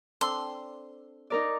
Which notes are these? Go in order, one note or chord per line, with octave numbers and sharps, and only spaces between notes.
C4 D4 A4 C6
D#4 A#4 D5